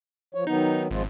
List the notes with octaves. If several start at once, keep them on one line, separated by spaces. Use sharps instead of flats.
F3 C#5
D#3 F#3 B3 D#4
G#1 F3 G#3 F4